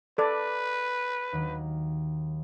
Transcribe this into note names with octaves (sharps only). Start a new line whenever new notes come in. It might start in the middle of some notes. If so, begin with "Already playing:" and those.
A4 B4 D5
D#2 D#3 F#3